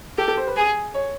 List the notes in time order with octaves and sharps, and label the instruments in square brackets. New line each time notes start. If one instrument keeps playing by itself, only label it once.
[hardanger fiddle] G4 [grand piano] A4
[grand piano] A4
C5
B4
[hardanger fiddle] G#4
[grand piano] C#5